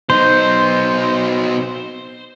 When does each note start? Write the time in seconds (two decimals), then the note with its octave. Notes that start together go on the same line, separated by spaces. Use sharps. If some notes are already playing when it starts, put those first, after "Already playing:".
0.10 B2 D#4 C5